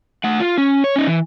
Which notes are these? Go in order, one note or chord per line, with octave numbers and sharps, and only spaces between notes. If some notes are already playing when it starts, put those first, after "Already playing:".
A3 F#5
F4
C#4
C#5
C#4 D#4
E3